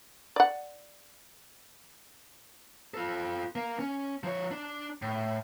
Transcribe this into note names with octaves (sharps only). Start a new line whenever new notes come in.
D5 F#5
F4 A4
A#3
C#4
F3 C#5
D4 D5
A2